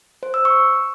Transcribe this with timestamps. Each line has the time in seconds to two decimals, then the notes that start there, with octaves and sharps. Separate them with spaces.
0.23 C5
0.34 E6
0.45 C#6